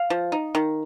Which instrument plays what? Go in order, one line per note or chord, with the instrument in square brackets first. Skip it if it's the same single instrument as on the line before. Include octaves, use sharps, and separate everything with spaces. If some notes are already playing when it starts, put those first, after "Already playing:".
Already playing: [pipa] F5
F3
D#4
D#3